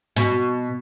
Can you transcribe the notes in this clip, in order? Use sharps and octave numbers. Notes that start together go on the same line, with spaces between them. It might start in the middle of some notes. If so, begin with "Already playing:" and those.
B2